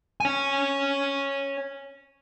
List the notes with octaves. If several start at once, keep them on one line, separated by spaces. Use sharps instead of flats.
C#5 G#5